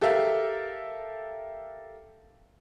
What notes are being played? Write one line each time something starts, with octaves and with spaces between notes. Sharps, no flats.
G4 A4 A#4 E5 F5